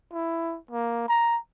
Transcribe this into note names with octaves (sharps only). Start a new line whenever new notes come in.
E4
A#3
A#5